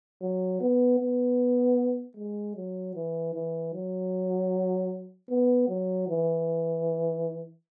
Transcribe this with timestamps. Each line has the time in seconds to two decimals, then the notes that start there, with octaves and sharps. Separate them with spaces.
0.22 F#3
0.61 B3
1.00 B3
2.17 G#3
2.56 F#3
2.95 E3
3.34 E3
3.74 F#3
5.30 B3
5.69 F#3
6.08 E3